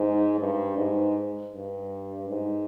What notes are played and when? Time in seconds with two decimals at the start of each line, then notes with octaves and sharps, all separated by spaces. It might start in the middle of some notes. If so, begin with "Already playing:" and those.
Already playing: G#2
0.40 G2
0.77 G#2
1.54 G2
2.30 G#2